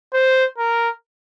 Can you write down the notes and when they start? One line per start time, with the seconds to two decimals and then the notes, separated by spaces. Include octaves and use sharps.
0.13 C5
0.58 A#4